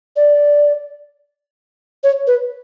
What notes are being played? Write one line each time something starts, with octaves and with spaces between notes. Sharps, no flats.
D5
C#5
B4